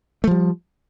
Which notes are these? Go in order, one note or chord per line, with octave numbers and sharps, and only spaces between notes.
F3 G3 A3